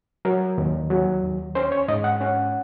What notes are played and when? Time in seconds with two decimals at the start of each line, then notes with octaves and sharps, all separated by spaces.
0.25 F#3 A#4
0.58 D#2
0.90 F#3
1.23 D#2
1.55 C#4 C5
1.72 C#5
1.88 G#2 D#5
2.04 F#5
2.21 C#4 F#5